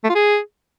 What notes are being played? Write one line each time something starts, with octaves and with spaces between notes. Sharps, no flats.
A3
F4
G#4